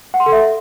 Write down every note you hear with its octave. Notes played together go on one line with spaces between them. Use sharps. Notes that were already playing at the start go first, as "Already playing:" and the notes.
F#5
C6
A4
E5